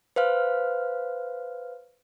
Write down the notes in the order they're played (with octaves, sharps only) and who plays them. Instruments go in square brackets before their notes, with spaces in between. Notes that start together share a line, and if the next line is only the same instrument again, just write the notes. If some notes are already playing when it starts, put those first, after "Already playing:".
[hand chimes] B4 C5 F5 F6